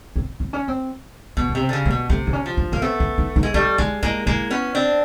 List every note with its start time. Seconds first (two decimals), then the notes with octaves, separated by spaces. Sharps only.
0.16 C4
0.40 C4
0.53 C#4
0.68 C4
1.37 B2 B3
1.49 C#4
1.55 C3
1.61 C4
1.69 D3
1.73 C#3
1.85 A#3
1.91 B2
2.09 C3 A3
2.27 C4
2.33 C#4
2.46 F3
2.57 D4
2.72 A#3 C#4
2.82 A3 B3 C4
3.00 C#4
3.18 D#4
3.36 D#4
3.43 G#3
3.54 G3 A3 D4
3.78 G#3 D#4
4.03 G#3 A#3 E4
4.27 G#3 A#3 E4
4.51 B3 C#4
4.75 C4 D4